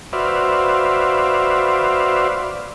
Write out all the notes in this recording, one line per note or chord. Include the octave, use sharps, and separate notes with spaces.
F#4 B4 C5 D5 E5 F5